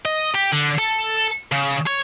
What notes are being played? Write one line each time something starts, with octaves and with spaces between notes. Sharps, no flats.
D#5
G4
D3
A4
C#3
C#5